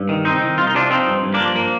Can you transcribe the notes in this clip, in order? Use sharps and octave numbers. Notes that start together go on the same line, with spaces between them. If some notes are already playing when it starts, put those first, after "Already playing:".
Already playing: G2
D#3
C2 C4 D#4
D#3
C2 F4
D#4
C3 D4 F4
F3 C4 D#4
G2
G2
A#3 D4
F3
A#3